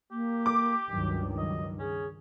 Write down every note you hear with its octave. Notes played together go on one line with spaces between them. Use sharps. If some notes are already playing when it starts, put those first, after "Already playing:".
A#3 G4
D6
C#2 G2 D#3 F#3
F#3 D#5
C#4 G#4